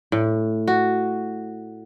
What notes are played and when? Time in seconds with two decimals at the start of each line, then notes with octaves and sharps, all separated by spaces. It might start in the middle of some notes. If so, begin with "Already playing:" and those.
0.12 A2
0.68 F#4